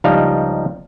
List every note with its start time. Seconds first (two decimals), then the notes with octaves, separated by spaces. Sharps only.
0.04 C#2 F3 G3 D4 D#4 F5